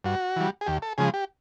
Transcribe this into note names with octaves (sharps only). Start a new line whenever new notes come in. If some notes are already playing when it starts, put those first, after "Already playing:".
G2 F#4
E3 G3
G#4
D#2 G4
A4
C#3 F3 G#3 G#4
G4